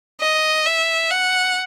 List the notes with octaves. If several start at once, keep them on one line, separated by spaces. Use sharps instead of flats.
D#5
E5
F#5